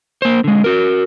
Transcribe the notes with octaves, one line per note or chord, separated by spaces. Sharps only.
A#3 C5
D3 G#3
F#4 A#4